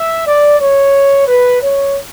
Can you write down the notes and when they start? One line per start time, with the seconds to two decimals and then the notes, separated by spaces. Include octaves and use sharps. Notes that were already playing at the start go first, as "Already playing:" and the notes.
Already playing: E5
0.26 D5
0.60 C#5
1.27 B4
1.62 C#5